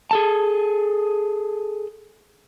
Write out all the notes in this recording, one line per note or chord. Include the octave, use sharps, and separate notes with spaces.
G#4 A4 A5